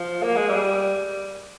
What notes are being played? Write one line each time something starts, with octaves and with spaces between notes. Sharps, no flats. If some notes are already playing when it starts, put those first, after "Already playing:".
Already playing: F3
A#3
G#3
G3